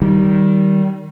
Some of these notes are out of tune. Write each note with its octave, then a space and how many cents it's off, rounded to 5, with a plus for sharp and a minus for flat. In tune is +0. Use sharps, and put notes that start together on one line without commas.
D#3 +0 G3 -20